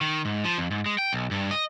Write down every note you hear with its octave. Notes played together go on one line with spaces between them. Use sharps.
D#3
G#2
F3
F2
G#2
G#3
G5
B1
G2
D#5